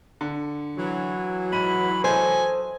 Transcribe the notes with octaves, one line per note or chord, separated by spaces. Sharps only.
D3
E3 F#3
G#2 B5 D#7
A4 C5 D#5 G#5